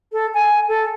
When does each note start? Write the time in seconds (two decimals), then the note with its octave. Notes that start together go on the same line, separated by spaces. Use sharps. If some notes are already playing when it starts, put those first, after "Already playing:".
0.12 A4
0.34 G#5
0.68 A4